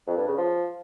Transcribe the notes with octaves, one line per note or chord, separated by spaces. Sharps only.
F2
G2
C#3
F3